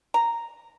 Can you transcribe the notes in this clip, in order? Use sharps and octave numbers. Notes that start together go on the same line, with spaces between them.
A#5